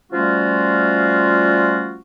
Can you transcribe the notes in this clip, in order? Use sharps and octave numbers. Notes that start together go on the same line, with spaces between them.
F3 G3 A3 C#4 F4 F#4